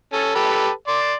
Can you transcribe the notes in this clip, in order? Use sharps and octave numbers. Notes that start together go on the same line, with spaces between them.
C#4 A4
G4 A4 B4
D5 C6